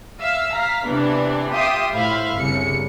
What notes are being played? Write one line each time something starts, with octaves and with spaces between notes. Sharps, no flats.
E5 F5 E6
F5 A#5 B6
C3 E3 B3 D4
F4 G4 E5 G5 C6 D#6
A2 E4 C5 E5 F5 B5
G1 C2 C#3 C#7